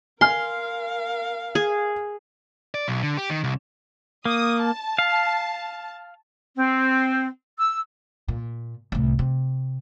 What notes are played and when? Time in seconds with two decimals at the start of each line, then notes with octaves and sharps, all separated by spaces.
0.21 A#4 F5 G#5 C6 F6
1.55 G#4
2.75 D5
2.88 B1
3.03 D3
3.17 G4
3.30 D#3
3.44 C2
4.25 A#3 D#6
4.62 A5
4.99 F5
6.57 C4
7.59 E6
8.28 A#2
8.92 C2 A2
9.19 C3